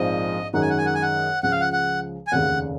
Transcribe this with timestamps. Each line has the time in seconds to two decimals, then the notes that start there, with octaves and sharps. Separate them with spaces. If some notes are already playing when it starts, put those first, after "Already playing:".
Already playing: A#1 G#2 F3 C4 D#5
0.53 F#2 D#3 G#3 D#4 F#5
0.62 G#5
0.70 F#5
0.78 G#5
0.86 F#5
0.95 G#5
1.02 F#5
1.43 C#2 C#3 F3 G#3 F#5
1.52 F5
1.60 F#5
1.73 F#5
2.27 G#5
2.32 F1 D#2 C#3 F#5